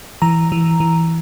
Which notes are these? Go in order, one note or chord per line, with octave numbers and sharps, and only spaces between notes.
E3 A#5
E3
E3